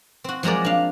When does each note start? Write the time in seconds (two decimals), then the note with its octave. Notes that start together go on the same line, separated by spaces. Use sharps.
0.24 C4 F#4
0.43 F3 F#3 G#3 A#4 D5
0.65 D4 F5